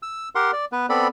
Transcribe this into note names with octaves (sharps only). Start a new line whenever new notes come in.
E6
G4 A#4 F#5 C6
D5
B3 B4
B3 C4 A4 D5 B5